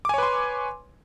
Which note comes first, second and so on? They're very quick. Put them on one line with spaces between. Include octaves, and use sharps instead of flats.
D6 G#5 C#5 B4 C6